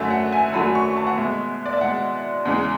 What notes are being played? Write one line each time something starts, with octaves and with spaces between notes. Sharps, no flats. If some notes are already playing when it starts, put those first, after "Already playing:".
Already playing: F#2 D3 F#3 A3 E5
F#5
G#5
F#2 D3 F#3 A3 B5
C#6
A5
F#5
B2 G#3 E5
D5
E5
B2 G#3 F#5
E2 C#3 G#3